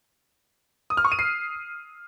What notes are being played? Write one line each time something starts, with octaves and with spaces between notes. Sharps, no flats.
D#6
F6
C#6
D#7
C7